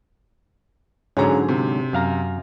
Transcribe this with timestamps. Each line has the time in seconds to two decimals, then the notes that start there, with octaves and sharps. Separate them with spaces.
1.17 G#2 D3 F#3 C#4 G#4 A#5
1.49 C3
1.93 F#2 F5 A#5